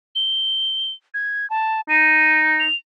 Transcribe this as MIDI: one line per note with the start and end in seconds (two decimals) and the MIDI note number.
0.15 0.91 103
1.14 1.48 92
1.50 1.81 81
1.89 2.64 63
1.89 2.41 99
2.60 2.75 101